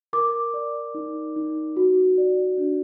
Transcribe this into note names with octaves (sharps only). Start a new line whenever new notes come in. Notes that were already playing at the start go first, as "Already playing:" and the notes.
A#4 D6
D5
D#4
D#4
F#4
D5
D4